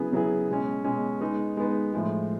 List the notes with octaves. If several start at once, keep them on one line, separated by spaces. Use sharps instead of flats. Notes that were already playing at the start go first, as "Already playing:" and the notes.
Already playing: C#3 F#3 B3 E4 G#4
C#3 F#3 B3 E4 G#4
B2 G#3 C#4
B2 G#3 C#4
G#3 B3 D#4
G#3 B3 D#4
A2 F3 G#3